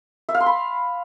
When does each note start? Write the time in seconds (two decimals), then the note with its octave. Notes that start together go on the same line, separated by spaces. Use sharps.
0.29 E5
0.34 F5
0.40 C6
0.46 B5